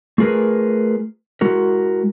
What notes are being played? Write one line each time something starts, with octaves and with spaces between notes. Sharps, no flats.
A3 F4 G#4 A#4 B4
G#3 E4 F#4 A#4